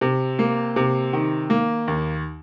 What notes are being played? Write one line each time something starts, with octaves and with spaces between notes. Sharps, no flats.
C3
A#3
C3
D#3
A#3
D#2